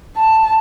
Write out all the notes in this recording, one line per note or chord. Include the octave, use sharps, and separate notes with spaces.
A5